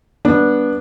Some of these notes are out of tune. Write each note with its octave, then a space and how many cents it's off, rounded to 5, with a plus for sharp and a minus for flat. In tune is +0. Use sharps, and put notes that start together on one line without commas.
G3 +0 B3 -15 D4 +0